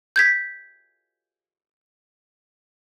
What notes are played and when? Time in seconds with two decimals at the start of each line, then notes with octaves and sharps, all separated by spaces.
0.16 G6 G#6 B6